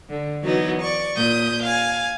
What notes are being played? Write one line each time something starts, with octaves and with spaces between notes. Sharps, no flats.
D3
E3 F#3 B3 D#4
D5 C#6
A#2 D#6 G6
F5 G#5